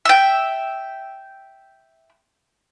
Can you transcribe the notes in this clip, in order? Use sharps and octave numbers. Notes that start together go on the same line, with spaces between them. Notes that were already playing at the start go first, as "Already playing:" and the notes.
E5 G5